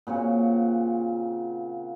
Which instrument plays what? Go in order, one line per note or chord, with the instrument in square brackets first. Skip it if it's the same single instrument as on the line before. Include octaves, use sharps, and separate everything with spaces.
[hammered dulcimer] A#2 C#3 C4 F#4